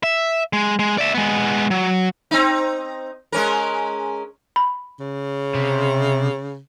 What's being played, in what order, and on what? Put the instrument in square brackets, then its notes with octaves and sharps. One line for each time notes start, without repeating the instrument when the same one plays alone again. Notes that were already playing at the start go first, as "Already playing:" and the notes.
[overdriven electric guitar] E5
G#3
G#3
D5 E5
G#3 B3
F#3
[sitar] C4 D#4
G#3 C#4 A#4
[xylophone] B5
[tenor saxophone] C#3
[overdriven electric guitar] C3